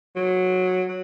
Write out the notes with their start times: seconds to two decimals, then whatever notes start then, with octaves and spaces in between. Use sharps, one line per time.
0.16 F#3
0.88 F#3